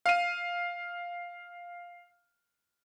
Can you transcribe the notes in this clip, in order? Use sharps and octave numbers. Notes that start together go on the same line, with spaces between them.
F5 D#7